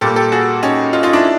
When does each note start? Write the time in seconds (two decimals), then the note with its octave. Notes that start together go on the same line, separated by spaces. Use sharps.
0.01 A#2 G3 A#3 G4 A4
0.16 G4 A4
0.32 F#4 G#4
0.63 C#4 D#4
0.93 D#4 F4
1.03 D#4 F4
1.13 D4 E4